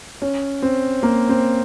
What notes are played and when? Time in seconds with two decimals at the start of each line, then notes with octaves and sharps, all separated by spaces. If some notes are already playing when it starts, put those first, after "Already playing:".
0.22 C#4
0.62 C4
1.03 A#3
1.29 C4